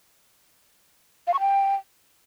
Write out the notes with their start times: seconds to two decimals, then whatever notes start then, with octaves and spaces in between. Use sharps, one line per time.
1.27 F5
1.34 C#6
1.40 G5